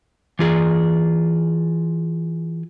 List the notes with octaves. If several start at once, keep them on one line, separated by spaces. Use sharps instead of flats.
E3 F4 G#4